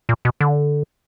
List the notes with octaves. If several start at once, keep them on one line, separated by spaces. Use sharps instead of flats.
A#2
B2
D3